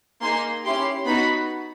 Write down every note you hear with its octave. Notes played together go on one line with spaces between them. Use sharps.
A#3 D#4 G#4 C6
C#4 E4 G4 C6
B3 D#4 F#4 B5